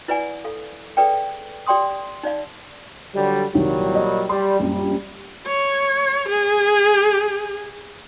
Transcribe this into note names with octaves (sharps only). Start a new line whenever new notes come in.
E4 B4 D5 F#5 G#5
A4 F5
G#4 A4 B4 D5 G5
G4 D5 G5 C6 D#6
D#4 D5 F5
D3 F#3 G3
C2 A#2 D#3 F#3 G3
D#5
G3 C6
A#1 F#2 G3
C#5
G#4